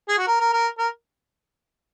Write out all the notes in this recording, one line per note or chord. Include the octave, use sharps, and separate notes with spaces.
G#4
F#4
A#4
A#4
A#4
A#4